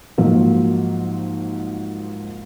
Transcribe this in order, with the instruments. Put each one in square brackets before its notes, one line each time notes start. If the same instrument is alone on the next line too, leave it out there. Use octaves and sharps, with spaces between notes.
[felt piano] G#2 F3 F#3 A#3